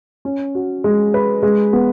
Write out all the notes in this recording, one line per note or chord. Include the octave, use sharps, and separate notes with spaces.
C#4
F#4
G#3
B4
G#3
B3